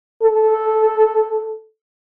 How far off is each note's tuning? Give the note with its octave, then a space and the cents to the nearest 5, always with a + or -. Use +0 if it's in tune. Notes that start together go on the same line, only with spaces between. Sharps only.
A4 -10